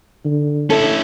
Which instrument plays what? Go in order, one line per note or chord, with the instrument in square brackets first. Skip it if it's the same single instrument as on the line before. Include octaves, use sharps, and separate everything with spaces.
[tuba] D3
[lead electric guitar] C#4 E4 [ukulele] A4